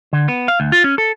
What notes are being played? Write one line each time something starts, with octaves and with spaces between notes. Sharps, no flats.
D3
B3
F5
D2
F4
C#4
A4